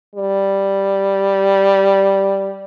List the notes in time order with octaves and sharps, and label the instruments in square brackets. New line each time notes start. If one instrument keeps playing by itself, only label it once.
[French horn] G3